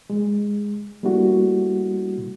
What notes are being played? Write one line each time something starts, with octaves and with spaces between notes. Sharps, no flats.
G#3
G3 A3 A#3 D4 E4 F#4